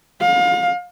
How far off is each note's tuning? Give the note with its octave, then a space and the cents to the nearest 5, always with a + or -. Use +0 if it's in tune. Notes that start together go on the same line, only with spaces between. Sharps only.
F5 +35